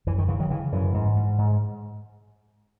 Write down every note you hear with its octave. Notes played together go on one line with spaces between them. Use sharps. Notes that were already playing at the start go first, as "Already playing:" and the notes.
F#2 E3
D#3
C#3 E3
D#3 F#3
C#3 E3
F#2 E3
G#2
G#2
G#2